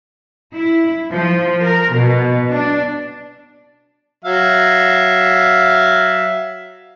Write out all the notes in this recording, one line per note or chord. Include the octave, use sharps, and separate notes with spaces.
E4
F3
A#4
B2
D4
F#3 E5 F5